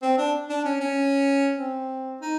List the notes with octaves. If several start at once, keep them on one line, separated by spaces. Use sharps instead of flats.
C4
D4
D4
C#4
C#4
C4
D#4